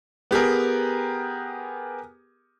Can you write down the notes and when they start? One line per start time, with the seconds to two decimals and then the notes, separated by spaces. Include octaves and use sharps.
0.31 B3 G4 G#4 A#4